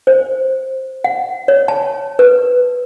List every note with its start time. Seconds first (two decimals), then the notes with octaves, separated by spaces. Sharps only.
0.07 C5
1.04 F#5
1.48 C#5
1.68 A5
2.19 B4